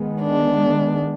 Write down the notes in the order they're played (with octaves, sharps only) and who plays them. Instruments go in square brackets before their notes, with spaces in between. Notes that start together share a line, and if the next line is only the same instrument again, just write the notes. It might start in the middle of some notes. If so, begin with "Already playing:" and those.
Already playing: [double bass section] D#3 G#3 B3
[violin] D4